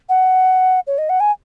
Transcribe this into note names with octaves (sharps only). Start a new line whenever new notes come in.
F#5
C#5
D#5
F#5
G#5